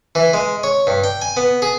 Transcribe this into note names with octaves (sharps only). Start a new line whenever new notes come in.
E3
G#3
C#5
G2
G5
G#5
B3
G#4